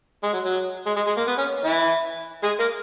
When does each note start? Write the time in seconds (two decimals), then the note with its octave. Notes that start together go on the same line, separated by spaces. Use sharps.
0.23 G#3
0.33 F#3
0.44 F#3
0.86 G#3
0.96 G#3
1.07 G#3
1.17 A#3
1.28 B3
1.38 C#4
1.65 E3 E4
2.43 G#3 G#4
2.60 A#3 A#4